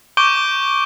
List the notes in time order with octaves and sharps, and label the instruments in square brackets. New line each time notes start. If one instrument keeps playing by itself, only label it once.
[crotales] C#6 D6 G6 D7 G7